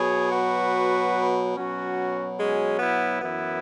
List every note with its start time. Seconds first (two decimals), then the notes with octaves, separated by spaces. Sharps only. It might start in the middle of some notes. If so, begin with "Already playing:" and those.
Already playing: B2 F#3 G#4 C#5
0.32 F#4 B4
1.56 B2 F#3 C#4 F#4
2.38 G#3 C#4
2.79 B3 E4
3.20 F#2 E3 B3 E4